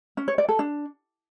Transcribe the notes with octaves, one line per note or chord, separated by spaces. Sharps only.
C#4
C#5
D5
A4
D4